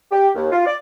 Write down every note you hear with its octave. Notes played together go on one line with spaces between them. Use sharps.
G4
D#2
F4
D5